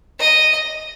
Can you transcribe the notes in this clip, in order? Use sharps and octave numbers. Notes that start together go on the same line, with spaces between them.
D#5